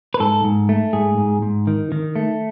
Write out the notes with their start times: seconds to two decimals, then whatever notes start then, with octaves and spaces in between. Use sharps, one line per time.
0.14 B4
0.20 G#2 A4
0.44 G#2
0.69 A3
0.93 G#2 G#4
1.18 G#2
1.42 G#2
1.67 D#3
1.92 D#3
2.16 A3